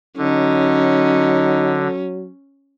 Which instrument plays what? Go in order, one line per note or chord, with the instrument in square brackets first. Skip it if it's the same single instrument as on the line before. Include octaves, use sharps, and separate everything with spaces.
[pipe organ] D3 [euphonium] F#3 [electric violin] C#4 [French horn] D#4